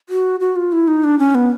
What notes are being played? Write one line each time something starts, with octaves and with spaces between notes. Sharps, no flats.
F#4
F#4
F4
E4
D#4
D4
C#4
B3